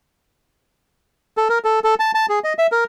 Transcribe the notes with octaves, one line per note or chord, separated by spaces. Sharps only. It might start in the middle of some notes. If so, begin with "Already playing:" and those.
A4
A#4
A4
A4
A5
A5
G#4
D#5
E5
A#4